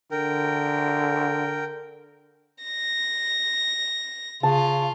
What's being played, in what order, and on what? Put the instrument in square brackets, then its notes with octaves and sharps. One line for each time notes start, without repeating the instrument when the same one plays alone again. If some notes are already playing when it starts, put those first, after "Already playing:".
[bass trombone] D3 [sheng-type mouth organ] A#4 G5
[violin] A#6
[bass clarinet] C#3 [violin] F4 [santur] A5